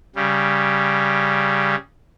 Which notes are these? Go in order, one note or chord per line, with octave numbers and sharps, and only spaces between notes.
C#3 G3